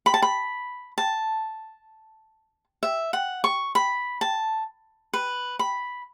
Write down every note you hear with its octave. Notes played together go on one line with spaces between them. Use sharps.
B5
A5
B5
A5
E5
F#5
C#6
B5
A5
B4
B5